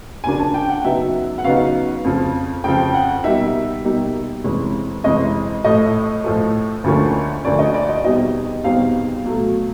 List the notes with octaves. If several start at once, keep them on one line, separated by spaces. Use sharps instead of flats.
D#2 C#3 F3 A#3 D4 G#5
A5
G5
F#5
C#3 F#3 B3 D#4 E5
F#5
C#3 F#3 B3 D#4 F5
F2 C#3 F3
F2 C#3 F3 G5
F#5
B2 G3 A#3 D#4 E5
B2 G3 A#3 D#4
F2 C3 E3 G#3 C#4
F2 C3 E3 G#3 C#4 D#5
A2 F3 A3 D#5
A2 F3 A3
D2 D3 F3 A#3 C#4
D2 D3 F3 A#3 C#4 D5
D#5
D5
D#5
E2 B2 G3 C4 D#4 D#5
E2 B2 G3 C4 D#4 F5
B2 F#3 A3